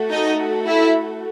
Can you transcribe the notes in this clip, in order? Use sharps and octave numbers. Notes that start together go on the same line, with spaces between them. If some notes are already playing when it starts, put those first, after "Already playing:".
Already playing: A3 F#4 A4
D#4 D#5
E4 E5